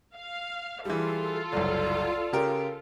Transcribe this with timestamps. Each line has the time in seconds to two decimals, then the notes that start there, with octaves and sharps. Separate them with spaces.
0.15 F5
0.85 E3 G3 F4 G#4 A4
1.52 F#1 C2 D5
2.32 C#3 G4 A#4